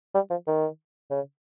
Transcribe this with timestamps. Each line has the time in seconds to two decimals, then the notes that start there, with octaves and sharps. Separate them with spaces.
0.15 G3
0.31 F3
0.47 D#3
1.10 C#3